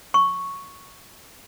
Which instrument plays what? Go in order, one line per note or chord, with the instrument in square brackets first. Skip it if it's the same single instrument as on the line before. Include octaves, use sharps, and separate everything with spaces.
[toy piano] C#6